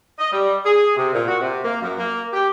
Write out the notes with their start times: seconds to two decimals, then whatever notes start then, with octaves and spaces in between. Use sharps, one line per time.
0.19 D#5
0.32 G3
0.66 G#4
0.97 C3
1.14 A#2
1.28 F#4
1.40 C3
1.64 A#3
1.81 F#2
1.98 A#3
2.33 G4